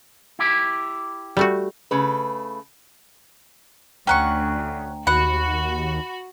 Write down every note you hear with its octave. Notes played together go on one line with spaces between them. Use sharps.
E4 G4
G3 A3 F#4
C#3 A3 B4
D2 C#4 F#5 G5 A#5 C#6
D#2 F#4 F#5 B5